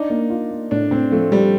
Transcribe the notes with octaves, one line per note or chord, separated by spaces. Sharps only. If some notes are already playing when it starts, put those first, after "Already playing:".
Already playing: D4 D#4
A#3
F4
A#3
A2 D4
A2 C4
F3 A3
F3 G3